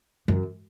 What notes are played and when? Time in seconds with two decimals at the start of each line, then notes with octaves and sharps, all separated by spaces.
0.28 F#2